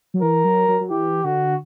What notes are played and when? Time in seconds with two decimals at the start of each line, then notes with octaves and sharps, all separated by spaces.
0.14 F#3
0.22 E3 A#4
0.44 F#3
0.68 F#3
0.80 F#3
0.90 E3 G4
1.24 D3 F#4